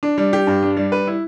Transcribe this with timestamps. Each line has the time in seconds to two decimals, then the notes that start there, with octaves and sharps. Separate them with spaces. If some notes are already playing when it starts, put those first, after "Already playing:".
0.03 D4
0.18 G3
0.33 G4
0.47 G2
0.63 D4
0.77 G3
0.92 B4
1.07 E4